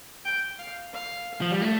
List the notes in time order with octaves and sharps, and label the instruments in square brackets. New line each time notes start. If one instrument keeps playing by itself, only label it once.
[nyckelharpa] G5
F5
F5
[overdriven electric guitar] F3
G3
A3